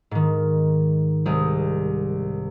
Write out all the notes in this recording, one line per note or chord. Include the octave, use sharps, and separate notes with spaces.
G#2 D#3
C2 G#3 C4